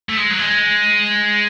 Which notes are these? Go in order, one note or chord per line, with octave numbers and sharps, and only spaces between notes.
A3
G#3
F#3
G#3